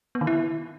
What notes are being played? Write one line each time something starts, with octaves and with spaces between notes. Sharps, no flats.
B3
D#3
E4